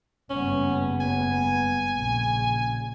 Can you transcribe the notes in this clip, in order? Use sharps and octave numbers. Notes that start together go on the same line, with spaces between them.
F#1 G2 B3 C#4
G#5
A#1 C#3